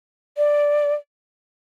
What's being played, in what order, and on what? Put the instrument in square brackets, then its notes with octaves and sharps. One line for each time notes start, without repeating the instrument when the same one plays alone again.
[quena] D5